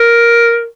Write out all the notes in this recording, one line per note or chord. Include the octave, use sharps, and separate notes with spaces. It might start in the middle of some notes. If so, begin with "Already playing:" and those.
Already playing: A#4